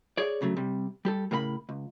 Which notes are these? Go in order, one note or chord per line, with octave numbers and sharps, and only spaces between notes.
G#4 C#5 D5
C2 C#3 F#3 A3
C3 G3
G3 G4 A4
A2 C#3 A#4 F#5 B5
C#2